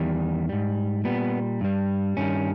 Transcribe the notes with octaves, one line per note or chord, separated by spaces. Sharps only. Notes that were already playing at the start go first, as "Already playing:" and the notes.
Already playing: E2 D#3 G3
G#2 G3
A#2 G3 B3
G2 G3
G2 D#3 G3 C#4